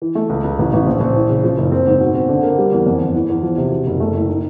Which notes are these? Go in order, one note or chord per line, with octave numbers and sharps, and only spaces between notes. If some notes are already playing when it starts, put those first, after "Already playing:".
E3
A3
C#2
C#2
A1
A1
A#1
A#1
E3
C#3
F3
F#1
C4
G#2
B2
C4
D3
A#3
G3
E2
F2
G1
E3
E2
F3
C3
B2
F#1
A3
A2
D#4